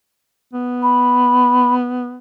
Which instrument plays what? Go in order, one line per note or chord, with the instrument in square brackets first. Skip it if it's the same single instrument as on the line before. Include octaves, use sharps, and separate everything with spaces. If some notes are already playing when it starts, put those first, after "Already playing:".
[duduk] B3
[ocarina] B5